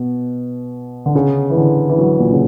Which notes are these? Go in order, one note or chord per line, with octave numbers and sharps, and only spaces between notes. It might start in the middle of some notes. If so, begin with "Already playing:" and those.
Already playing: B2
D3
C#3
E3
D3
E3
F#3
A#2
C#3